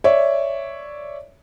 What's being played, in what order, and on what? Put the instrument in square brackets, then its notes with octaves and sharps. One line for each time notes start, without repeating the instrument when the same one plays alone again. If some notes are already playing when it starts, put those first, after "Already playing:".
[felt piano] C#5 D5 E5